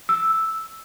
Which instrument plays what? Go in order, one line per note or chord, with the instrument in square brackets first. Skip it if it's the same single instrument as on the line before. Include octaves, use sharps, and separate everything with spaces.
[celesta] E6